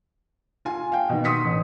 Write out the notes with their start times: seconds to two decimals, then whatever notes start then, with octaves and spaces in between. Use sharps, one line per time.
0.65 F4 G#5
0.92 F5 G5
1.09 B2 D#3
1.24 C6 D#6 B6 C#7
1.44 A1